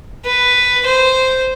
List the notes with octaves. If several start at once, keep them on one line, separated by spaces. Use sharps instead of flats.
B4
C5